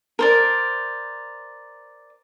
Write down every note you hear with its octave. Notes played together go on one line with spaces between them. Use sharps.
A#4 C5 D5